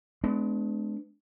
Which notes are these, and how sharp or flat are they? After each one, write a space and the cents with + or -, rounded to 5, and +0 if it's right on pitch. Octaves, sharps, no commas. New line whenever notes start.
G#3 +40 B3 +35 D4 +0